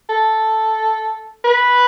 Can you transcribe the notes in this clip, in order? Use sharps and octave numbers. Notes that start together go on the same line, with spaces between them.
A4
B4